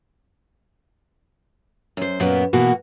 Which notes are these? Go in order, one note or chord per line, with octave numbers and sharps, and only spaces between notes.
F#2 C5
F#2 A#2 A#3 B3
B2 E3 A#3 F#4